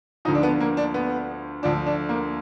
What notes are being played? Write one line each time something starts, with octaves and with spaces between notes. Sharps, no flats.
D2 D3 F3 D#4
D4
B3
A#3
D4
B3
D2 D3 F3 D4
D4
A#3